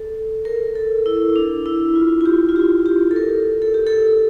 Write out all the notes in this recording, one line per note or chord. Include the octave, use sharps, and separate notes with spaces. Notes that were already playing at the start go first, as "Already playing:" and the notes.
Already playing: A4
A#4
A4
E4
D4
E4
F4
F4
G4
F4
G4
G4
A4
A#4
A4
G4
A4